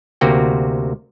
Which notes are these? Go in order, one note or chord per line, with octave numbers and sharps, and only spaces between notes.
D2 C3 A#3 F#4 G5